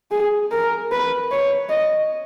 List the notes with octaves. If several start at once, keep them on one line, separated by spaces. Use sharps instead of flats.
G#4
A#4
B4
C#5
D#5